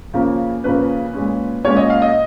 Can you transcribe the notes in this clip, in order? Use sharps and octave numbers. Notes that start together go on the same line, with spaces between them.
C#3 F3 A#3 C#4
C#3 F3 A#3 C#4 B4
A#2 G#3 C#4
A#2 G#3 C#4 C#5
D#5
F5
D#5